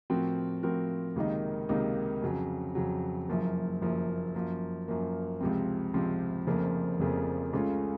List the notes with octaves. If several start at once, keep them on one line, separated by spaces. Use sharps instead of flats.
A2 F3 C4 F#4 A#4
A2 F3 C4 F#4 A#4
C#2 C3 D#3 A#3 D#4
C#2 C3 D#3 A#3 D#4
F2 C#3 F#3
F2 C#3 F#3
F#1 F#2 F3 A#3
F#1 F#2 F3 A#3
F#2 F3 A#3
F#2 F3 A#3
C#2 C3 F3 C4
C#2 C3 F3 C4
F1 F2 C#3 F3 A#3
F1 F2 C#3 F3 A#3
C#2 C#3 A3 C#4 F4